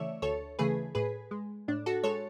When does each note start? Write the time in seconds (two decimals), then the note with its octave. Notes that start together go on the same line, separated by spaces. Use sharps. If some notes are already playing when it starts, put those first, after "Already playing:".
Already playing: C#3 E3 A3 C#5 D5 E5
0.22 D2 A4 C#5
0.59 C#3 E3 A3 G#4 B4
0.95 A2 G#4 B4
1.31 G#3
1.68 A2 D4
1.86 F#4 A4
2.04 G#3 A4 C#5